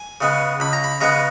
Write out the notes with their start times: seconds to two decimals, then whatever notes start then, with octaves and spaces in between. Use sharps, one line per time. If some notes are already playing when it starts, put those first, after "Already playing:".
Already playing: G#5
0.21 C#3 G#3 B3
0.60 C#2 B5
0.73 A#5
0.84 B5
1.01 C#3 G#3 B3 A#5